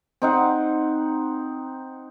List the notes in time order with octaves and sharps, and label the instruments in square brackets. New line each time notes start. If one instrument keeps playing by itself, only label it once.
[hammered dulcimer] C4 D#4 F#5